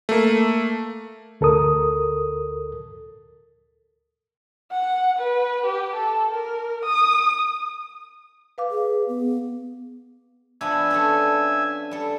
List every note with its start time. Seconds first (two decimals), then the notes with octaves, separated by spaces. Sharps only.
0.09 A3 A#3
1.41 D2 A4 A#4 D#6
4.72 F#5
5.19 B4
5.66 G4
5.96 A4
6.31 A#4
6.85 D#6
8.58 B4 F5 D6
8.71 G#4
9.08 B3
10.61 F3 B3 D4 E5 G#5
10.90 C#4 D4 A4
11.91 G3 A4